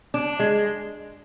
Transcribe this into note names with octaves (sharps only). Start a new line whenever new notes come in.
D4
G#3